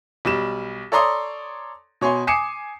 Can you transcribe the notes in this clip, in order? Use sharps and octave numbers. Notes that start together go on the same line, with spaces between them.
B1 G3 E7
A4 C#5 D5 A#5 C6 D#6
B2 C#5 G#5 C6
G#5 D6 D#6 C7 C#7 E7